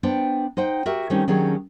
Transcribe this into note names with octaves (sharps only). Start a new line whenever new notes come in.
B3 D4 C5 G5
D#4 C5 F#5 G5
F#4 G4 A#4 E5
D#3 G3 A3 C4 C#4 D#4
D#3 F#3 C#4 D4 G4 G#4